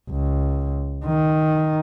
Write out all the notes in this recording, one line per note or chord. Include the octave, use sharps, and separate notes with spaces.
C#2
D#3